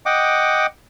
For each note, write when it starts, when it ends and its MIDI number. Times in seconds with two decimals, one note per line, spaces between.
0.06 0.66 75
0.06 0.66 78
0.06 0.66 79
0.06 0.66 86